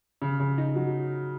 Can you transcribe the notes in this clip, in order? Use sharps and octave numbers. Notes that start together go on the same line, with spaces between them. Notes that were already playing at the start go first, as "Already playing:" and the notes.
C#3
C#3
D#4
F#3